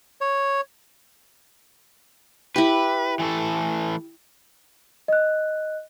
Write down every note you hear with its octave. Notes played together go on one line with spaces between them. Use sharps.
C#5
E4 G4 B4
E3 A3 A4
D#5 F#6